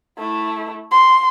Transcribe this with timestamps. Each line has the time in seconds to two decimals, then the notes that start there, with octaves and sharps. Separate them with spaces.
0.18 A3 E4
0.91 C6